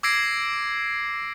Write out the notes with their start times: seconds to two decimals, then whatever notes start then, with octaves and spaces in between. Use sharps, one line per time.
0.03 D6 E6 G#6 A#6 C7 D7